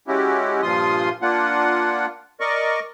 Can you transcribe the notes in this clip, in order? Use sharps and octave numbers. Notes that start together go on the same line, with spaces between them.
G#3 C#4 E4 F#4 G4
G2 A#2 F3 F4 C6 D#6
A#3 D4 F4 F#5
A#4 D5 D#5 C#6